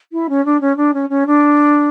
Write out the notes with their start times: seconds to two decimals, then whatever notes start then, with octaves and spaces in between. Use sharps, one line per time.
0.12 E4
0.29 C#4
0.45 D4
0.61 C#4
0.76 D4
0.93 C#4
1.09 C#4
1.26 D4